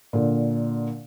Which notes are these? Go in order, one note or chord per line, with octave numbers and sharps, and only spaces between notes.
A#2 D3